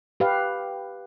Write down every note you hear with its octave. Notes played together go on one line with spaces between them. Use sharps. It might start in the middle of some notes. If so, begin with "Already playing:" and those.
G4 B4 F5